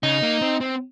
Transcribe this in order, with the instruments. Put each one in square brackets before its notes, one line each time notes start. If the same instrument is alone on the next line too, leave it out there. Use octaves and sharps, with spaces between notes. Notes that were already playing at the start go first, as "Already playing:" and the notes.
[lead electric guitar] C#3 [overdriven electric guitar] D#4
[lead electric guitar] A#3
C4
C4